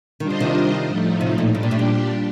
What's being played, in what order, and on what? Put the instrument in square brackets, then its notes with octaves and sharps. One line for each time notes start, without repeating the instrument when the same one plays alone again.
[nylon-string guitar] D#3 [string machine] G3 D4 F4 C5 D#5
[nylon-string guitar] D3
C3 D#3
[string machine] A2 F3 A3 D#4
[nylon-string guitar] C3
A#2
[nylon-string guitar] A2 [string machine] G3 D4 G4
[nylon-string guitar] A#2
A2
A#2